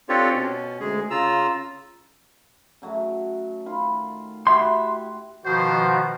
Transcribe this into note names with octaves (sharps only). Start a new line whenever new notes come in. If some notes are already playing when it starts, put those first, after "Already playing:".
C4 D4 F4 G4 A4 C#5
B2 C#4
D2 G#3 G#4
C#3 F4 A#5 E6
C#3 F#3 A3
D#3 F4 B5
E4 F#4 G4 E5 C6
B2 D#3 F3 F#4 C5